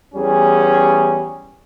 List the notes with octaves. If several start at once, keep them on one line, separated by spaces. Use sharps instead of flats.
E2 G3 C#4 G#4